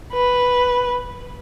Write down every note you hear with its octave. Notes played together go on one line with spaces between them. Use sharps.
B4